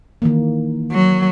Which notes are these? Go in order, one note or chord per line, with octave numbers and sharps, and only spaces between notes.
D#3 E3 A#3
F#3